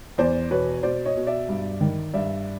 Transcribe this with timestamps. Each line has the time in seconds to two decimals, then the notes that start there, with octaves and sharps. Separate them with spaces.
0.18 E2 C5 D5
0.50 B2 B4 C#5
0.83 B2 C5 D5
1.05 C#5 D#5
1.17 B2
1.27 D5 E5
1.49 G2
1.81 D#3
2.14 G2 D5 E5